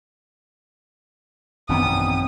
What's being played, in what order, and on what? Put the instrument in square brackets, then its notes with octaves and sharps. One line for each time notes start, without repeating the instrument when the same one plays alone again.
[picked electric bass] A1 F#2 D#3 [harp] B2 D4 [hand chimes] C4 G5 [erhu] D#6